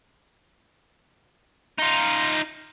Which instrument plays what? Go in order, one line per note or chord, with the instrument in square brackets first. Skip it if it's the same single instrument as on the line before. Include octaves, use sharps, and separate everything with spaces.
[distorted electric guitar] D#4 F4